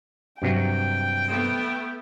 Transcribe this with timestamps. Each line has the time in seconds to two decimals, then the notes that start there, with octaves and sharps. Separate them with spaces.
0.42 G2 C3 F#3 G5
1.27 A3 B3